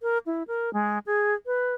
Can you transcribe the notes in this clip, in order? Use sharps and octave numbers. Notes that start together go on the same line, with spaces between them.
A#4
E4
A#4
G#3
G#4
B4